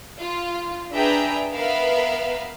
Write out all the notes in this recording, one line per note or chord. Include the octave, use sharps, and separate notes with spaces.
F4
D4 G#4 B4 E5 G5 A#5
B3 A#4 E5 F5